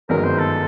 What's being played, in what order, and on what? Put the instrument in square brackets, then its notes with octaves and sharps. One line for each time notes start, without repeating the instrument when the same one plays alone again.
[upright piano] G1 F#2 D#3 G#3 [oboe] A#4
[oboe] C5
A4